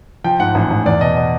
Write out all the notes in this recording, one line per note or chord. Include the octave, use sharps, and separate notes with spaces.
F3 G5
G#2 F#5
A1
A1
E2 D5
B2 D#5
D#5